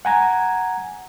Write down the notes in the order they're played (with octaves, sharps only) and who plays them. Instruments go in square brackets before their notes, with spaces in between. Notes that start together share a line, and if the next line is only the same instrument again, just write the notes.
[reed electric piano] F#5 G#5 A#5 G#6